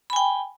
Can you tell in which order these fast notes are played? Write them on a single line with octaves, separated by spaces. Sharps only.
B5 G#5 G5